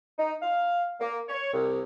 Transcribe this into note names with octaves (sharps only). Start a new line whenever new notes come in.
D#4
F5
A#3
C#5
C2